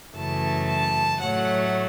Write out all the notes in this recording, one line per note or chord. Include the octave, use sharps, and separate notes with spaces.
F#2 C#3 E3 A3 A5
A5
A2 F#3 A3 F#5